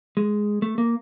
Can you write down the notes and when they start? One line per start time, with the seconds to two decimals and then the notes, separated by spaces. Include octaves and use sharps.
0.17 G#3
0.62 A3
0.78 A#3